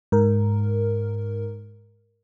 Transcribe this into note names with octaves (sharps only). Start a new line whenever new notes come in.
G#2 A#4